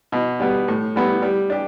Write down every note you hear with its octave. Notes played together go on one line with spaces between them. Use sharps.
B2
G3 B3
A2
G3 B3 E4
G3
D4 G4